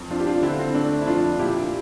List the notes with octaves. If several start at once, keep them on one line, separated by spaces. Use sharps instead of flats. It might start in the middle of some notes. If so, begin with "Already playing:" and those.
Already playing: F2
C4 D4 F4
G4
D4 F4
D3 C4 E4
C4
A3 D4
E4
F2 D4 F4
A#2 E4 G4